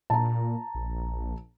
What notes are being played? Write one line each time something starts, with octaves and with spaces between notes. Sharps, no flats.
A#2 A5 A#5
A#1